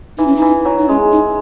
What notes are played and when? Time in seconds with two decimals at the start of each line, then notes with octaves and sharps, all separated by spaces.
0.18 E3 D#4
0.27 C#4
0.36 D#4
0.42 E3
0.65 F#3
0.79 D#4
0.89 G#3 C#4
1.12 D#4